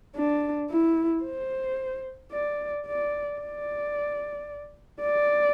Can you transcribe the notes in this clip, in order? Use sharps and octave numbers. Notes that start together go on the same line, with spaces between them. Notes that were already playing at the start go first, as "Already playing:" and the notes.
D4
E4
C5
D5
D5
D5
D5